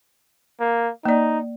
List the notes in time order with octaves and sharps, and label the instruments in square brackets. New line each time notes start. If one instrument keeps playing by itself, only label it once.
[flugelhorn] A#3
[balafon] A#3 D5 [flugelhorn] D#4